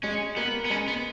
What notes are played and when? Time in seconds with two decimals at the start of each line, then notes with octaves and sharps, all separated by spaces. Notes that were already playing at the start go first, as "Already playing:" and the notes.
0.03 G#3 C#4
0.37 A#3 B3
0.65 B3
0.70 G#3 C#4
0.88 B3